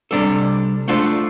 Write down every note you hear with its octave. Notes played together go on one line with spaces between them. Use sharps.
C3 G3 D4 A4
A3 D4 F4 A4 C5